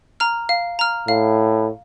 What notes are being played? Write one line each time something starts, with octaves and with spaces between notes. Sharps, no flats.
A#5 F6
F5
A#5 F6
A2 F5